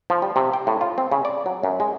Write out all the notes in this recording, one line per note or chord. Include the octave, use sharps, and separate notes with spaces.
F3
G3
C3
G5
A2
F4
C4
C#3
D5
F#3
F#2
G#3